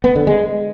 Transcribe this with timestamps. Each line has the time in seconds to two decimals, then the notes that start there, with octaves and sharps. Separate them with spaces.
0.04 B3
0.15 D3
0.27 G#3